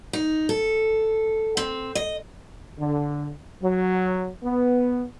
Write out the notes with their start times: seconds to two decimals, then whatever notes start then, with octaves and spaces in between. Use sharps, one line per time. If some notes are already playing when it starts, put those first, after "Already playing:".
0.13 D#4
0.49 A4
1.57 C4
1.95 D#5
2.78 D3
3.62 F#3
4.44 B3